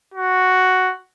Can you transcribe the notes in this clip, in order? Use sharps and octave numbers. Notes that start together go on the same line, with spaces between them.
F#4